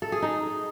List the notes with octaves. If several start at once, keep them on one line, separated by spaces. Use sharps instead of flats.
A4
G#4
D#4